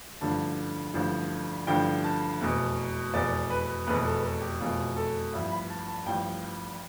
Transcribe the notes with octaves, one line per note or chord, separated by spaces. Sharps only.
A1 G2 D3 F3 A5
A1 G2 D3 F3
A1 G2 D3 F3 G5
A5
F1 E2 B2
F1 E2 B2 D5
B4
F1 E2 B2 B4
A4
B4
A4
G4
F1 E2 B2 F4
A4
A1 G2 F3 E5
B5
A5
A5
A1 G2 F3 G5